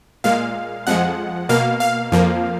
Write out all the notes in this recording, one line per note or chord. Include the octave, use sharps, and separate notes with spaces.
A#2 G#3 F5
F2 F3 G#3 F#5
B2 A#3 F5
F5
F2 F3 A#3